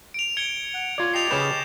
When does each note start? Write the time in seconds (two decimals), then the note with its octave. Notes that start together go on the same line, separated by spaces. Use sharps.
0.14 D7 F7
0.37 G#6 C#7 G7
0.74 F#5
0.98 F4 C#5 D5
1.14 G4 D#5 A5 C7 F7
1.31 C#3 C#4 B4 G6 E7